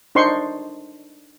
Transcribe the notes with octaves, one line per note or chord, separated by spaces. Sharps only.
D4 D#4 C5 C6 C#6